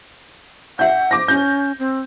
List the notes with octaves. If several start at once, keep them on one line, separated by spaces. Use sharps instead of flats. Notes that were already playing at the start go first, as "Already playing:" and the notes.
E5 F#5 G6
D6 A#6
C#4 G6
C4